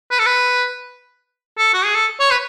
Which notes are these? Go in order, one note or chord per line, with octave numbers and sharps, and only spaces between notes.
B4
A4
B4
A4
F#4
G#4
A4
C#5
B4